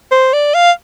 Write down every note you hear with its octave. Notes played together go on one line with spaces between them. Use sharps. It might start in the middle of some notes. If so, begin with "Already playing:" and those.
C5
D5
F5